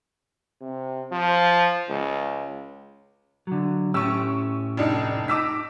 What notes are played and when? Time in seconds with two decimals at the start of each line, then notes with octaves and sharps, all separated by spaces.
0.61 C3
1.12 F3
1.89 C#2
3.47 D3 F#3
3.94 A2 C#4 G4 C#6 E6
4.77 F1 D4 D#4
5.28 D#4 D6 E6 B6